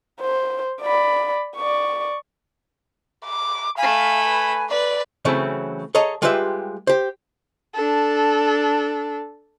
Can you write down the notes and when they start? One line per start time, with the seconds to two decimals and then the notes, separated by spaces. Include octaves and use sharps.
0.20 C5
0.82 D5 B5
1.56 D5 C#6
3.26 D6
3.78 A3 F5 G#5 B5
4.24 B4
4.70 B4 D5
5.25 C#3 E3 F#3 A3 C4
5.95 G#4 A4 C#5 D#5 A#5
6.22 G3 G#3 F4 G4 B4 E5
6.87 G4 C5
7.74 D4 A4